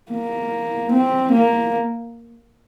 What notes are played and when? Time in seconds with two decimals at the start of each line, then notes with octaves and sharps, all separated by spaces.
0.12 A#3
0.93 C4
1.32 A#3